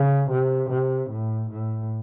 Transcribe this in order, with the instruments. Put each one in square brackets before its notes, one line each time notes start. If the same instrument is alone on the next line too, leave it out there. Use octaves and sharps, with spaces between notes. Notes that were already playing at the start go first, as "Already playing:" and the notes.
Already playing: [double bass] C#3
C3
C3
A2
A2